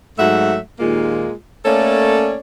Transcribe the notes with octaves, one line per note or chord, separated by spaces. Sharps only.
G#2 F#3 A3 E5 F#5
D#2 A#2 G#3 A#3 F4
A3 A#3 C#4 A4 C#5 D5